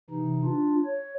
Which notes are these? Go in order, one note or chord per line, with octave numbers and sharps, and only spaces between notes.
C3 E3 D#4
D4 F4
C#5